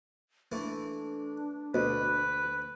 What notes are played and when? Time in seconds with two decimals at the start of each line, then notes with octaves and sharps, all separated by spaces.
0.52 E3 A3 D4
1.74 D2 B2 B4